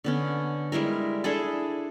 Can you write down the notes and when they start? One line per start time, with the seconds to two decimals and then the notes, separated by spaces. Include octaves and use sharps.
0.04 D3 B3 C#4
0.72 G3 G#3 E4 A#4
1.24 D4 E4 G#4 A4